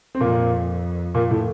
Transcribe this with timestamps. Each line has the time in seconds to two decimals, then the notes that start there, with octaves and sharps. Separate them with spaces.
0.15 C4
0.20 F2 A#2 A#3
1.15 A#2 A#3
1.31 A2 A3